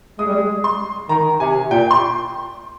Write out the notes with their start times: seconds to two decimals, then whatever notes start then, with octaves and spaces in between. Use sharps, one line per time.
0.19 G#3 D#6
0.27 G3
0.36 G#3
0.64 C6
1.09 D#3 A#5
1.40 C3 G#5
1.71 A#2 G5
1.91 C6